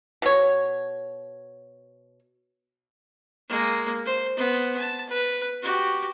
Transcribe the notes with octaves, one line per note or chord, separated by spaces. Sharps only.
B2 C#5
G#3 A#3
C5
B3 C5
A5
B4
F#4 G4